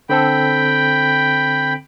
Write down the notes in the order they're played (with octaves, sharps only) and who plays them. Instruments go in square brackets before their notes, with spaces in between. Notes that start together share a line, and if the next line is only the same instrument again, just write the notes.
[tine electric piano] D3 C4 A4 [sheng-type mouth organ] G5 B5